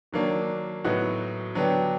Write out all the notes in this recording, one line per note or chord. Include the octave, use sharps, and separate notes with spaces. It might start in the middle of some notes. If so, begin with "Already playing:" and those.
D#3 F#3 A#3 D4
A2 F#3 B3 D#4 F#4
D3 F#3 B3 D4 G4